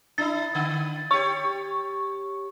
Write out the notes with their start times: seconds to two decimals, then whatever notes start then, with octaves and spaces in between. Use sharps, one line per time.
0.18 D4 E4 A6
0.55 D3
1.11 G4 C#5 C#6